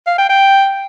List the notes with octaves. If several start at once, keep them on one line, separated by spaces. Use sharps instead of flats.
F5
G5
G5